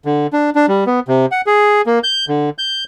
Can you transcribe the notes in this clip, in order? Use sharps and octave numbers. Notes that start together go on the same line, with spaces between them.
D3
D4
D4
G3
B3
C3
F#5
G#4
A#3
G6
D3
G6